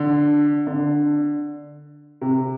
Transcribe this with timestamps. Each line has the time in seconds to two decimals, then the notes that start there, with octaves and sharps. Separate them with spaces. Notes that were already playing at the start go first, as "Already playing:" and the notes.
Already playing: D3
0.67 D3
2.21 C3